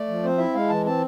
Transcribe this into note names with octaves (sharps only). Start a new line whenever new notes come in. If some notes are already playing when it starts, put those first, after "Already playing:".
Already playing: A3 D5
F3
C4 C5
E4 E5
G#3 F5
E3 A5
C4 A5